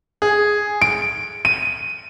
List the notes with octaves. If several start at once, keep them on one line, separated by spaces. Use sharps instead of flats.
G#4
D7
D#7